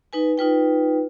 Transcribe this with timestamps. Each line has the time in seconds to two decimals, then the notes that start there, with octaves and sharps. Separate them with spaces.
0.13 D#4 B4 G#5
0.38 D#4 F4 B4 G5